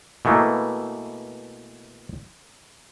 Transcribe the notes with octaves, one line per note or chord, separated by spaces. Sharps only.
B2 E3 A3 A#3